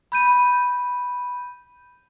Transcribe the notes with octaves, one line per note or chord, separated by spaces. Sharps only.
B5 G6 D#7